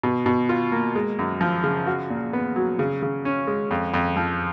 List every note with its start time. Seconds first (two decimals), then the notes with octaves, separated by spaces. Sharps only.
0.03 B2
0.26 B2
0.49 F4
0.72 A#3
0.95 G#3
1.19 F#2
1.41 F3
1.64 C#3
1.87 F#4
2.10 A#2
2.33 B3
2.56 F#3
2.79 C#3
3.02 C#3
3.25 C#4
3.47 G#3
3.71 F2
3.94 F2
4.17 F3